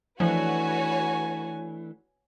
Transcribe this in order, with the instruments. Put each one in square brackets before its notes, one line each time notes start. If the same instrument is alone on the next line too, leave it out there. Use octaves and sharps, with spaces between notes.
[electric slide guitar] E3 A3 D4 [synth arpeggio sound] F3 [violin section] F#4 B4 C#5 [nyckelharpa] G#5